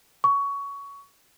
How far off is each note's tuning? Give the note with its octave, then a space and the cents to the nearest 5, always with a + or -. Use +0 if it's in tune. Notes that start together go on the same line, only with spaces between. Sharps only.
C#6 +20